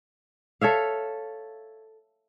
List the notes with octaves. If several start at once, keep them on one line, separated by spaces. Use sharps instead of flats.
A4 C#5 E5 F5